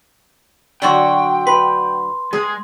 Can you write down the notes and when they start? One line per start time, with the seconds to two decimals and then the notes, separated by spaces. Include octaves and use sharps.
0.82 D3 F#3 F#4 G5 C6 G7
1.47 B4 C6
2.33 G#3 G#4